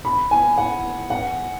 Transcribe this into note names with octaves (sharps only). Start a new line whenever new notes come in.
B5
G#5
F#5
F#5